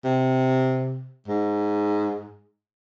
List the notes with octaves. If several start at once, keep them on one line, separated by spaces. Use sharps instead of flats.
C3
G#2